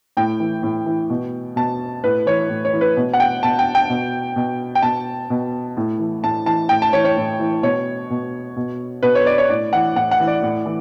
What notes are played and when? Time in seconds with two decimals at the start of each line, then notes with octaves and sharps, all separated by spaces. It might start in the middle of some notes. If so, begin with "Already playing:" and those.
0.17 A2 G5
0.40 E3
0.63 A2
0.86 E3
1.10 B2
1.56 B2 A5
2.04 A2 B4
2.26 E3 C#5
2.49 A2
2.65 C#5
2.73 E3
2.81 B4
2.97 B2
3.14 F#5
3.20 G5
3.43 B2 A5
3.59 G5
3.75 G5
3.89 B2
4.36 B2
4.75 G5
4.82 B2 A5
5.30 B2
5.77 A2
5.99 E3
6.23 A2 A5
6.46 E3 A5
6.69 A2 G5
6.82 A5
6.93 E3 C#5
7.05 C#5
7.17 A2
7.39 E3
7.63 B2 C#5
8.10 B2
8.56 B2
9.03 B2 B4
9.15 C#5
9.26 D5
9.38 C#5
9.49 A2 D5
9.73 E3 F#5
9.96 A2 F#5
10.11 F#5
10.20 E3
10.28 D5
10.42 A2
10.66 E3